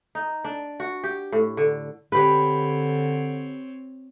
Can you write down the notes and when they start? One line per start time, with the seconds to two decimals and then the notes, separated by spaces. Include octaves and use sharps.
0.15 D#4
0.44 D4
0.80 F#4
1.04 G4
1.32 A2
1.57 D3
2.12 D3 C4 G4 B4 C#5